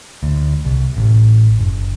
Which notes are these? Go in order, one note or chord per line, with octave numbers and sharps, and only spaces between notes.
D2
C2
A1
F#1